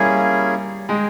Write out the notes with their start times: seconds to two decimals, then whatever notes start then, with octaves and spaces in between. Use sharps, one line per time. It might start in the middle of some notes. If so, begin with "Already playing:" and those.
Already playing: G3 A#3 C#4 E4 G#4
0.89 G#3 G#4 D#5 G5